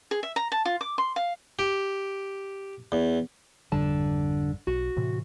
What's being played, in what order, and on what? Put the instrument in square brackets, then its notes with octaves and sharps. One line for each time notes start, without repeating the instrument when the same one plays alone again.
[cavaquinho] G#4
E5
A#5
A5
F4
D6
C6
F5
[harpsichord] G4
E2
[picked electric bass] G#1 F2 G3 [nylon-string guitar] D3 A5
[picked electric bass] B1 [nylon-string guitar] F#4
[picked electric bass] A2 C3 E3